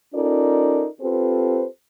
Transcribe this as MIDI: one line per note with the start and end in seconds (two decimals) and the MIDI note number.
0.14 0.86 61
0.14 0.86 63
0.14 0.86 65
0.14 0.86 69
0.14 0.86 70
0.14 0.86 74
1.01 1.65 60
1.01 1.65 65
1.01 1.65 67
1.01 1.65 69
1.01 1.65 71
1.01 1.65 72